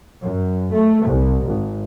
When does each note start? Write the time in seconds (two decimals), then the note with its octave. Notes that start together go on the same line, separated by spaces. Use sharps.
0.21 F#2
0.73 A3
1.07 C2
1.45 G#1